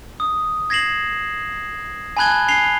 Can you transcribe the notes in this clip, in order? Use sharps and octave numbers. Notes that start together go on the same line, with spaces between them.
D#6
G#6 A#6 C7 E7 F#7
G#5 A5 B5 F#6 G#6 G7
G#5 C7 F7 G7